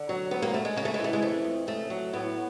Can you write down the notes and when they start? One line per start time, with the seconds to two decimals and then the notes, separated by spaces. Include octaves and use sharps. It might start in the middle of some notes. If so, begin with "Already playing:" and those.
Already playing: D3
0.09 F#3
0.31 D2 B3
0.42 A#3
0.53 D2 A3
0.65 G#3
0.76 C#3 A#3
0.85 A3
0.94 G#3
0.99 E3
1.04 A3
1.13 G#3
1.22 F2 A3
1.44 F2
1.67 C#3 A3
1.90 F#3
2.13 A2 B3